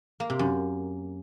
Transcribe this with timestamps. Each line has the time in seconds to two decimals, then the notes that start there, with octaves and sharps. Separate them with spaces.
0.20 A#3
0.30 C3
0.39 F#2